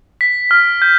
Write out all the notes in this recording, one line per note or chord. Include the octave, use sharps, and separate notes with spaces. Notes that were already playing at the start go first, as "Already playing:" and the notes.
B6
F6
G6